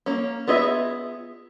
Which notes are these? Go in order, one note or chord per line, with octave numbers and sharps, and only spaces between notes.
A#3 C#4
B3 F4 G#4 D#5 E5